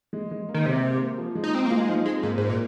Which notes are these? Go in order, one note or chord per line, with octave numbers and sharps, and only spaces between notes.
G#3
G#3
A#3
D#3
C3 C4
A#3
F3
G#3
D#4
C4
A#3
F4
G#3
F3 D#4
G#3 C4
G#2 A#3
G#2
A#2